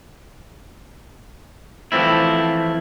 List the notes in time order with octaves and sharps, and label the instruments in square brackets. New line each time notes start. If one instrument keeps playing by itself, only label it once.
[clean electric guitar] E3 F3 A3 C4 E4